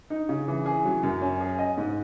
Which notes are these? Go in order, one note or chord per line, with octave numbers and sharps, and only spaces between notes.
D#4
C#3
E3
G#4
F#3
F#2
C#4
G#4
D#5
G#2